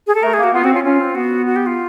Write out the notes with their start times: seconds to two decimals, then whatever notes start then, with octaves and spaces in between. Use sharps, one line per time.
0.07 G#4
0.15 A4
0.23 A3 A#4
0.34 G#4
0.38 A#3
0.44 F#4
0.53 B3 F4
0.64 C4 F#4
0.74 C#4 F4
0.84 C#4 F4
1.00 C4
1.15 B3 F#4
1.46 F#4
1.56 G4
1.66 F4